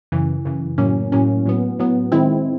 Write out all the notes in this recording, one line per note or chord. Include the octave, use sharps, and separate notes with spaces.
F#2 C#3 E3
F#2 C#3 E3
A2 F#3 A#3 C#4
A2 F#3 A#3 C#4
A2 F#3 B3
A2 F#3 B3
D#3 G#3 C4 E4